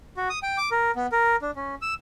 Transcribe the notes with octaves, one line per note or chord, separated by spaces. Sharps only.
F#4
D#6
G5
D6
A#4
B3
A#4
D4
C#4
E6